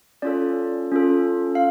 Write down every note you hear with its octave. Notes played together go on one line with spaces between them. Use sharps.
C#4 F4 A4 D5
C#4 F4 A4
F5